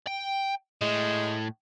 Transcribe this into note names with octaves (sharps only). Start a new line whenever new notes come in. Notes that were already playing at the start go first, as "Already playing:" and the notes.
G5
A2 G#3